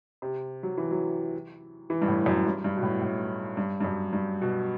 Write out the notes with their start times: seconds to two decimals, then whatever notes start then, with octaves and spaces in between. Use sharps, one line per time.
0.22 C3
0.63 F#3
0.77 E3
0.91 F#3
1.90 E3
2.02 G2
2.08 A2
2.26 F#2
2.45 G2
2.64 G2
2.77 B2
2.83 A2
3.01 A2
3.57 G2
3.80 G2
3.85 F#2
4.13 G2
4.42 B2